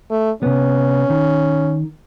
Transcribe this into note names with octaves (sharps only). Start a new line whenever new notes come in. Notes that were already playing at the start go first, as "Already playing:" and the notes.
A3
C3 B3 C#4
D#3